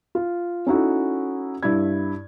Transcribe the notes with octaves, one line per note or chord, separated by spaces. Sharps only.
F4
C#4 D#4 E4 F#4 A4
G2 E4 B5 G#6